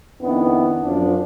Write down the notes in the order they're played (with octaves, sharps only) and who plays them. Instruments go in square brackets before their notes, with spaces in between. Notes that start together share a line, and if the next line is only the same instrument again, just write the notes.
[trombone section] F2 D#3 B3 C#4 D4 E4
F#2 F3 D4